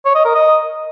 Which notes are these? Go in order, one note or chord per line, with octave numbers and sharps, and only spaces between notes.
C#5
D#5
A#4
D#5